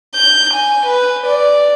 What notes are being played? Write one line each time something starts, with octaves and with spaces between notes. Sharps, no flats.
G6
G#5
B4
D5